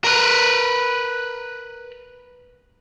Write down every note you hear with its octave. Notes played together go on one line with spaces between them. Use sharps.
A#4 B4